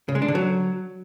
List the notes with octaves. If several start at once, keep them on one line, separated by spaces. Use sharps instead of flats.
C#3
G#3
D4
D3
F#3